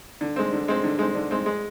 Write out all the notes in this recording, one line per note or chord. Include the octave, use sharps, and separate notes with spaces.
D3
G#3 C4
D3
G#3 C4
D3
G#3 C4
D3
G#3 C4
G#3